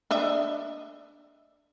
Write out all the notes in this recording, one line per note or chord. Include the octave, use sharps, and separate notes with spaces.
D4 D#5 E5